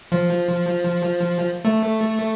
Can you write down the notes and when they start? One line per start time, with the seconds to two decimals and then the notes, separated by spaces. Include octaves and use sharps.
0.12 F3
1.65 A3